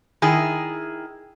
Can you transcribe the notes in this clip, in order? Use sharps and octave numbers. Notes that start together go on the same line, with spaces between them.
D#3 E4 G#4